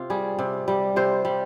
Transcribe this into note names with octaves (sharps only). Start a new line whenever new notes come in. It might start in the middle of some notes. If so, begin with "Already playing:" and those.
Already playing: C3 F4
G3 G#4
C3
G3
C3 C5
G3